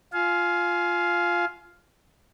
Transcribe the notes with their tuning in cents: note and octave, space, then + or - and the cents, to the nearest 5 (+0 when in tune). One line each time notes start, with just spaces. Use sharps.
F4 +0 F5 +0 G#5 +30